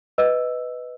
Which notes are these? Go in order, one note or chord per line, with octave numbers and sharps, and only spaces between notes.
B4 D#5 E6